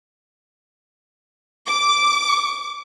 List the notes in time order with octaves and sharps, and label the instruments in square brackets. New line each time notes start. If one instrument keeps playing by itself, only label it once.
[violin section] D6